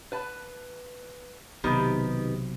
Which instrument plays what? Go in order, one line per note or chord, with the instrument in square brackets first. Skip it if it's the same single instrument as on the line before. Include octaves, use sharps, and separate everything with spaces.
[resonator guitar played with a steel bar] B4 A5
[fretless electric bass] B1 C3 [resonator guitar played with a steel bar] D#3 B3 G4